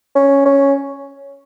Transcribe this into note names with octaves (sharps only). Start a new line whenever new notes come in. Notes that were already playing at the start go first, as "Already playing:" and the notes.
C#4
C#4